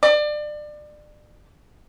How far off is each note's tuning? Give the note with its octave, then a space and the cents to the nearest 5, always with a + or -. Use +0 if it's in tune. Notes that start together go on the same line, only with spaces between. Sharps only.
D5 +30